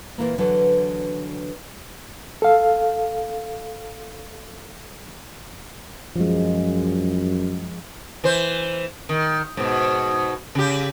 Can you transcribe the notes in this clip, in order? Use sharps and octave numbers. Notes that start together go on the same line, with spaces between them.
A#2 E3 A#3
D3 E3 F#3 B4
A4 F5
F#2 F3 G#3
E3 C5
D#3
G#2 B2
C#3 G4